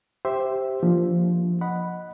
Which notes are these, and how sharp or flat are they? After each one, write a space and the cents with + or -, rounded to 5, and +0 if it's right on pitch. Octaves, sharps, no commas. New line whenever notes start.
G4 +0 C5 +0 E5 +0
F3 +0 A#3 +0 D4 -20
D#5 +0 F#5 +0 B5 +0